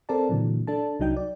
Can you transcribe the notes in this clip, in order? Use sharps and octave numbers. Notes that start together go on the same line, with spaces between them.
C4 A4 A#4 D5 A5
A#2 D3 E3 F#3
D4 A4 A5
C2 F#3 D#4 G5
D5